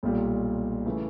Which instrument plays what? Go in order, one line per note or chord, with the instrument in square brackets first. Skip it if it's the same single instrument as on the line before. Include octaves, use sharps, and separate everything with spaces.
[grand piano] B1 A#2 G3
C#3 E3 A3